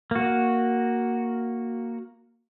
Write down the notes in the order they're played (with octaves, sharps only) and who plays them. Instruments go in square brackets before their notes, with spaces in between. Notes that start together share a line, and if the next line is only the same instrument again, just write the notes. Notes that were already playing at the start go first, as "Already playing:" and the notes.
[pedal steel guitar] A#3 F#4